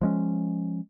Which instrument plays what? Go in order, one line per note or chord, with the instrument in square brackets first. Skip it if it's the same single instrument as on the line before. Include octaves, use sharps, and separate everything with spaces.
[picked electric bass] F3 G#3 C#4